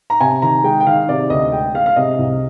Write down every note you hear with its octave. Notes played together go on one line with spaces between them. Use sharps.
A#5
C3 G#5
D#3 A#5
G#3 G5
G5
D#3 F5
C3 D5
D2 D#5
G#3 G5
G#3 F5
F5
C3 D#5
C2